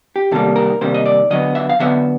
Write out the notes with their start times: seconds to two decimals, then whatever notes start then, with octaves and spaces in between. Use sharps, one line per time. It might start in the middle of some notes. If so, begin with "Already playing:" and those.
0.16 G4
0.31 C3 D#3 G3 A#3 A4
0.56 A#4
0.81 C3 D#3 G3 A#3 C5
0.94 D#5
1.06 D5
1.30 D3 F#3 B3 D#5
1.55 E5
1.69 F5
1.80 D3 F#3 B3 E5